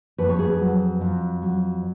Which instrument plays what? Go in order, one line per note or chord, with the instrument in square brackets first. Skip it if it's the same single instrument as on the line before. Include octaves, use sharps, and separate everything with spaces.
[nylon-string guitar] F2 B4
C#5
G#4 B4
F#3
F2
F#3